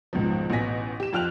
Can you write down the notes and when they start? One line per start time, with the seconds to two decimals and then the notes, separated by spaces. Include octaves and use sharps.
0.13 G#1 C#2 B2 F3
0.50 A1 B2 B3 G#5 A#6 B6
1.00 G4 E7
1.13 F2 F4 G5 F6 F#6 F7